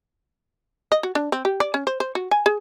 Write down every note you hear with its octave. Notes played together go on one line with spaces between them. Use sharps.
D#5
F#4
D4
C4
G4
D5
C#4
C5
C5
F#4
G#5
G#4